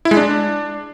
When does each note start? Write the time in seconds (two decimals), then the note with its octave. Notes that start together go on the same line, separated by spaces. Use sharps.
0.05 E4
0.11 G#3
0.17 D4